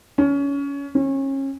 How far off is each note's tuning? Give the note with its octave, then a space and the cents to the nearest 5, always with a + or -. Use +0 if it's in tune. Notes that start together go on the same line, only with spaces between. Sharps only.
C#4 +25
C#4 -30